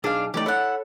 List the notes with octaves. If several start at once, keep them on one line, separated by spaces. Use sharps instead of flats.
B1 D4 D#4 G#4 F5
E3 A3 D#4 G4 D5
E4 A4 C#5 F#5